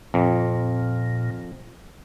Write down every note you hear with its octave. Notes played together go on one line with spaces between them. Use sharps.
F2 A#2